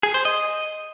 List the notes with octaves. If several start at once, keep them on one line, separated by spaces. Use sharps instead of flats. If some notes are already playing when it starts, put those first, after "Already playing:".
G#4
C5
D#5